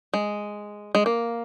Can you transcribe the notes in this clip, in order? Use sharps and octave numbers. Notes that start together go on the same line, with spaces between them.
G#3
G#3
A#3